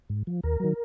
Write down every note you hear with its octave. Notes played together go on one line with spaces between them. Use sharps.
G#2
F3
D#2 A#4
D#3 F#3